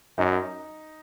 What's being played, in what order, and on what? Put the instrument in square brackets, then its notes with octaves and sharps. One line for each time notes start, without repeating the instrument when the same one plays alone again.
[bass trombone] F#2 [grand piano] D#4